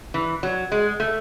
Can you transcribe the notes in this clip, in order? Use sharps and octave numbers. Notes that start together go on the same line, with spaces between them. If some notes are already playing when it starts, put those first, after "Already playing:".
E3
F#3
G#3
A3